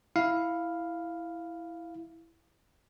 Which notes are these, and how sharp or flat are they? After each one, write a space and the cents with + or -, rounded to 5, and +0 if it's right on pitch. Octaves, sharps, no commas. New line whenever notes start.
E4 +0 F5 +0